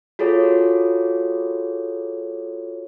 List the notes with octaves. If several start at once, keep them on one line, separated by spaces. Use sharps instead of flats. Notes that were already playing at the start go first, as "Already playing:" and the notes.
F4 F#4 G#4 A4 C#5